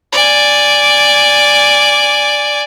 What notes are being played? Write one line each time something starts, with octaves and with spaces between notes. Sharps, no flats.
D5 G#5